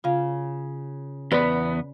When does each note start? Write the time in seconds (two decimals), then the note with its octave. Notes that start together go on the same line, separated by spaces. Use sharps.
0.04 C#3 F4 F5
1.32 E2 B3 B4 D5